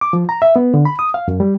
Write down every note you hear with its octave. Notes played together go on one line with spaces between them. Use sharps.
D6
F3
A#5
E5
B3
D3
B5
D#6
F5
F#2
G3